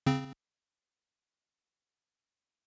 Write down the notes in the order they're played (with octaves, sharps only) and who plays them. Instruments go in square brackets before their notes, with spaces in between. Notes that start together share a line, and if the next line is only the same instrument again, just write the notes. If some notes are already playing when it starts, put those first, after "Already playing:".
[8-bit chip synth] C#3 C4